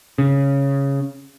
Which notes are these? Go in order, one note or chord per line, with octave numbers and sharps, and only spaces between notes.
C#3